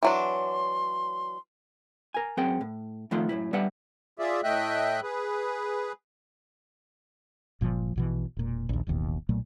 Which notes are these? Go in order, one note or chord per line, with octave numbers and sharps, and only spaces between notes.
E3 F#3 D4 C6
A#4 G#5
F#2 C4 G#4 A#4 F#5 G5
A2
F2 D#3 A3 F4 F#5 C6
F#2 A2 C3 E4
G3 D4 B4 E5 F#5
F4 G#4 D5 E5
A2 A3 D#5 E5 G5 F#6
G#4 B4
G1 A#2 C#3 F3
A#1 B2 E3
E1 A#2
A#1 D#2
D#1 A1 D#2 B2
B1 A#2 F#3 A3